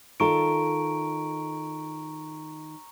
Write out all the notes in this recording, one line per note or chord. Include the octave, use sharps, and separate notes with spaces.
D#3 F4 A4 A#5 C#6 D7